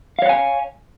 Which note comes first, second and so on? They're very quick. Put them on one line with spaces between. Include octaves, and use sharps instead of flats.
F5 C#5 F#5 G#5